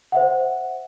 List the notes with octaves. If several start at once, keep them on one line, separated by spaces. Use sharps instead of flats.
C5 E5 F#5